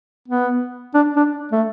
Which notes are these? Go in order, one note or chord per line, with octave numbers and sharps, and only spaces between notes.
B3
D4
D4
A3